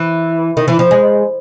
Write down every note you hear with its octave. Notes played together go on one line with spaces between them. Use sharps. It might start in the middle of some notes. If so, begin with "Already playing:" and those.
Already playing: E3
D#3
E3
F3
G#3